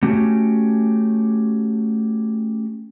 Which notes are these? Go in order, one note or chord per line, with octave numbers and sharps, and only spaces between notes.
A3 C#4 F#4 G4